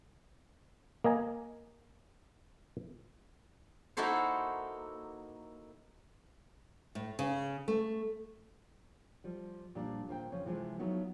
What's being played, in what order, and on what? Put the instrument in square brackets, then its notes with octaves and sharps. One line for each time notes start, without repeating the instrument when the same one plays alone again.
[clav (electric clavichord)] A#3 D#5 G#5 A#5
[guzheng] A#3 D#4 E4 F#4 A4 C5
[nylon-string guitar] A2
C#3
A3
F3 G3
A#2 F3 G3 D4
D#2 A#2 C5 G5
C#3 F3 C#4
C3 E3 F3 G#3 A3
F3 F#3 A3 B3 D#4